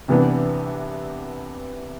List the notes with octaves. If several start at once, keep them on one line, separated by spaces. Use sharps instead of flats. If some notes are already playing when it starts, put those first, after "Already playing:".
C2 C3 E3 B3 D4